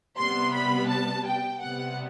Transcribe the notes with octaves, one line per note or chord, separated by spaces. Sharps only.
C3 G3 B3 C6
B5
A5
G5
C3 G3 B3 F#5